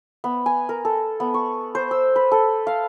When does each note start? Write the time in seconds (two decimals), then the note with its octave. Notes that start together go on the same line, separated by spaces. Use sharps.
0.24 B3
0.46 G#5
0.69 A#4
0.85 A4
1.20 B3
1.34 C#6
1.75 C5
1.91 E6
2.16 B4
2.32 A4
2.67 F5